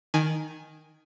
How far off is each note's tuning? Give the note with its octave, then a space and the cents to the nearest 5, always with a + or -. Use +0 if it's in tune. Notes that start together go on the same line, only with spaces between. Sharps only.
D#3 +0 G#5 +0